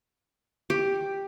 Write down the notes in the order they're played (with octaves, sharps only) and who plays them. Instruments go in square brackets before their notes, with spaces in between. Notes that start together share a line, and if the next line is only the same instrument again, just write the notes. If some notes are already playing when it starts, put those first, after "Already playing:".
[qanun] G4